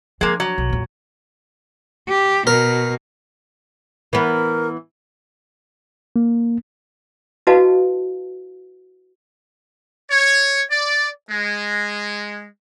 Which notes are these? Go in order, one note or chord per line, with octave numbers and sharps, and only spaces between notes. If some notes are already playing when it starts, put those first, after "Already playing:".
F3 G#3 A#3 D4
F#3
B1
E2 A#2
G4
B2 A#4
E3 B3 A#4
A#3
E4 F#4 B4 D#5 F5 A5
C#5
D5
G#3